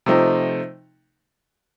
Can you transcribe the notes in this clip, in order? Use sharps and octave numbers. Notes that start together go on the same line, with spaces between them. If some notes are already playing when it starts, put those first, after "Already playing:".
C3 F3 A3 C4 D#4